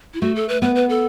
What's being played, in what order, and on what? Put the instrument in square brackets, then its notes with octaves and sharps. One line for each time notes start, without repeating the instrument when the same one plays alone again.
[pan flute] E4
[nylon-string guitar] A3 [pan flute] F#4
[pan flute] A4
B4
[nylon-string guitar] B3 [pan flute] B4
[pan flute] B4
A4